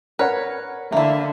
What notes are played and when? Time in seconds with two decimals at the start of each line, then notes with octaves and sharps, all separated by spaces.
0.19 A#4 B4 C#5 F#5
0.92 D3 A#3 E4 E5